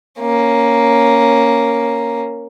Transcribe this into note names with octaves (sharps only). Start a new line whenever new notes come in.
A#3 C#4